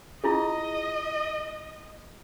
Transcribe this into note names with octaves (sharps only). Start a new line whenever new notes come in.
E4 F4 G#4 D#5